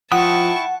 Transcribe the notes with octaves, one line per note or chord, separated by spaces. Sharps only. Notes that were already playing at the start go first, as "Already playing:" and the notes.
F3 E4 F#5 G5 A5 C#6 D#6